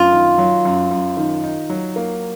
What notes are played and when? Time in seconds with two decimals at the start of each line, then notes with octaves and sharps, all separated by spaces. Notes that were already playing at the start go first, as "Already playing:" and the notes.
Already playing: F#2 F4
0.12 D#3
0.38 F#3
0.65 F#2
0.90 F#2
1.17 D#3
1.43 D#4
1.70 F#3
1.96 A#3